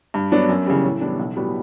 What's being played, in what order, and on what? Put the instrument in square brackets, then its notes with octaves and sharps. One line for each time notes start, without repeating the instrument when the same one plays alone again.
[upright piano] G2
F#3 B3 D4
F#2
C#3 E3 G3
A2
E3 G3 B3 D4
B1
A2 G3 B3 F#4